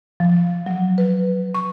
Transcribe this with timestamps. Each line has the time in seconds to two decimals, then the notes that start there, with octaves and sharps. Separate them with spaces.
0.20 F3
0.66 F#3
0.98 B4
1.55 C#6